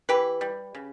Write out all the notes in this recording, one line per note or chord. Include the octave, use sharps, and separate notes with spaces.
E3 G4 B4
G3
C#3